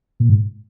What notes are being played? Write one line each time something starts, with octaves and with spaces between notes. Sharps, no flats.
A#2
G#2